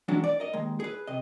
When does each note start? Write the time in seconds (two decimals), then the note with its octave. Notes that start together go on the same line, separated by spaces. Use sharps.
0.08 E3 F#3 G#3 C#4 D4 F#4
0.24 D5
0.40 A#4 D#5
0.53 D#2 G#3
0.80 G#4 B4
1.07 C3 D#5